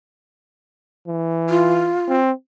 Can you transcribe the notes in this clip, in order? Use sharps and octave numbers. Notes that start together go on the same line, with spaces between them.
E3
F4
C4